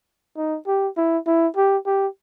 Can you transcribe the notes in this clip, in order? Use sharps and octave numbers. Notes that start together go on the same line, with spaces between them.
D#4
G4
E4
E4
G4
G4